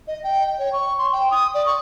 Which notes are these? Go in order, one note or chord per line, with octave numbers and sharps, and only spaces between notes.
D#5
G5
G5
C#5
C#6
C6
G5
D#6
D5
C#6